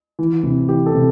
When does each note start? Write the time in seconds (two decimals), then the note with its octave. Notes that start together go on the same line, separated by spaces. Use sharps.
0.19 E3
0.43 C3
0.69 E3 G4
0.86 A4
0.95 C3